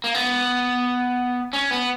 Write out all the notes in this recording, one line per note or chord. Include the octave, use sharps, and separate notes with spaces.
A#3
B3
C#4
B3